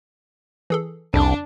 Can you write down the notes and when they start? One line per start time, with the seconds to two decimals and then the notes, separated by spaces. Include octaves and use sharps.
0.70 E3 G#4 A4
1.14 C2 F2 C#3 D4